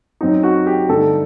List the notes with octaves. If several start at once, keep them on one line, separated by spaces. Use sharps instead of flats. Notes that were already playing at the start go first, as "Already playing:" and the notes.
F#2 F#3 C4 D#4
F#4
G4
G2 D3 A3 D#4 A4